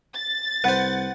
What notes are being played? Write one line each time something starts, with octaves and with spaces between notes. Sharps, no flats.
A6
C2 B4 C5 F#5